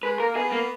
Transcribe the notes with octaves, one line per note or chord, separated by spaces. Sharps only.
G#3 B4
A#3 A#4
B3 G#4
A#3